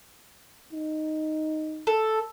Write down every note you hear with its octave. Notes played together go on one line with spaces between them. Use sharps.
D#4
A4